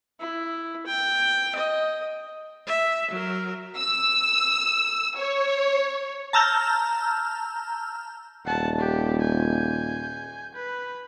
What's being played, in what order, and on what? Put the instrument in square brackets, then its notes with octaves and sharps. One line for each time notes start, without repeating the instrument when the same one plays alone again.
[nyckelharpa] E4
G5
D#5
[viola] E5
F#3 A#4
[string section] E6
C#5
[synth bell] A5 A#5 E6 F6 G6
[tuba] D#1 [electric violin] F#5 A5
[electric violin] G4
G#5 G6
B4